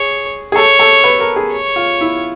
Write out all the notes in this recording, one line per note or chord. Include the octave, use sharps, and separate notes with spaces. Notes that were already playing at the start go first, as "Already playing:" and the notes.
Already playing: G#4 C#5
G#4
A4 C#5
A4
B4
A#4
G#4
C#5
F4
E4